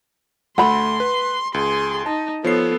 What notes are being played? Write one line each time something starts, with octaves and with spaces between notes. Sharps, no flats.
D2 A3 F#5 B5 C6
B4
C#2 G#4 C6
D#4 A5
F3 B3 A4 C#5 C7